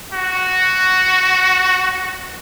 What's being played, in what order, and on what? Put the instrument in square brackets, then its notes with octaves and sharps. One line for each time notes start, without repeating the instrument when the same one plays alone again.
[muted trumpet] F#4